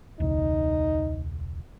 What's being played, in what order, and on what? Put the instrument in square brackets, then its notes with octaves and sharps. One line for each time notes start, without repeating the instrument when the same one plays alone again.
[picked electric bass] E1 C#2 [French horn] D#4